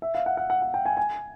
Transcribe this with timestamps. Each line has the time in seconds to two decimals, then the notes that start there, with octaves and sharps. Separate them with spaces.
0.02 E5
0.15 F5
0.26 F#5
0.37 F#5
0.50 F#5
0.62 F#5
0.74 G5
0.85 G#5
0.97 G#5